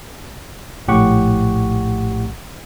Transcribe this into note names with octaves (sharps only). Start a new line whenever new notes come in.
A#1 A2 G4 F#5 C#6